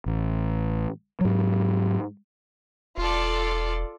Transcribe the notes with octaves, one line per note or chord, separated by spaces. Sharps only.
A1
G#2 F#3
E1 F4 A4 D5